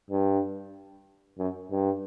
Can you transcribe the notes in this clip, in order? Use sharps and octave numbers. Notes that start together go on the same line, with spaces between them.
G2
F#2
G2